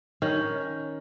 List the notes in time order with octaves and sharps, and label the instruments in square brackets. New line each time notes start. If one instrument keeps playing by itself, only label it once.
[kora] D#3 C#4